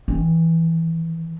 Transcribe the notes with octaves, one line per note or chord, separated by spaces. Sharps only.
D#3 E3